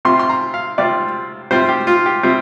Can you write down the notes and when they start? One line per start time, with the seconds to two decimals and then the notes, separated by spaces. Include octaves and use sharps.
0.05 C3 G3 C4 F4 C6
0.19 C6
0.29 A#5
0.54 F5
0.78 C3 G3 C4 F4 D5
1.51 C3 G3 C4 F4 C5
1.69 G4
1.87 F4
2.06 G4
2.23 C3 G3 C4 F4